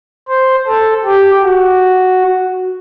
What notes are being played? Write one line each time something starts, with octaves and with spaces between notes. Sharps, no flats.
C5
A4
G4
F#4